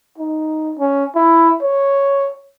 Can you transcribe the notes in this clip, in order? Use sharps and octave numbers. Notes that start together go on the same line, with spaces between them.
D#4
C#4
E4
C#5